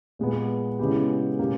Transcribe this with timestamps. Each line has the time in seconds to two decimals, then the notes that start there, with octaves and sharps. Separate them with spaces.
0.19 A#2 G#3 B3
0.79 C#3 G#3 B3 E4 G4
1.39 B2 A#3 C#4 G4